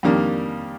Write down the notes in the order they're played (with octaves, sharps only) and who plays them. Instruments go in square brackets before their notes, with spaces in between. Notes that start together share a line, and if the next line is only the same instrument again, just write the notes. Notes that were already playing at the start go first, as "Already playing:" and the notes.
[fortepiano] F2 D#3 G3 A#3 D4